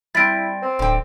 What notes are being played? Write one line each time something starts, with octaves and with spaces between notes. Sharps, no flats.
G3 C4 E4 A6 B6 D7
C4
D1 D3 G5